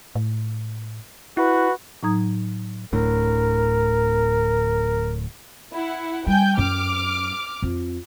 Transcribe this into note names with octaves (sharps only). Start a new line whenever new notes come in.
A2
E4 F#4 B4
A2 F#3 D#4 A#5 D#6 G#6
D1 A2 D3 A#4
E4 F#5
G3 G5 G#5 G6
F#2 D6 F6
F2